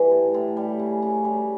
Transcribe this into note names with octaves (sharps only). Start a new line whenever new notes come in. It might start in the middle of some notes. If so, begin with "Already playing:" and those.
Already playing: E3 G3
A2
A2
G3
C#3
C#3
G3